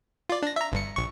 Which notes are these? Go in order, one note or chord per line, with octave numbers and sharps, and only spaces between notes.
F4 D5
D4 A#6
E5 A#5
G1 G2 C#7
A#1 C#6